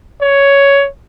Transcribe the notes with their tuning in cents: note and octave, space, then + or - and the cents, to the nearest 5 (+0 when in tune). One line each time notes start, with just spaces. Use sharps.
C#5 +10